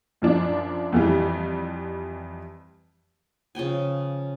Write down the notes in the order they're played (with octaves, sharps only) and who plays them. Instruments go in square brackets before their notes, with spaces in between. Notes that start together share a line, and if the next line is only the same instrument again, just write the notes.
[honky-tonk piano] F#2 F3 D4
F2 E3 G3
[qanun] C#3 F3 G5 G#5